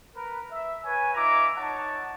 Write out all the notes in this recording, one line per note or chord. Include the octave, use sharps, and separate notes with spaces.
A#4 B4
E5
B4 C#5 G#5
D#4 F4 E5 A#5 D6
D#4 C#5 F#5 A5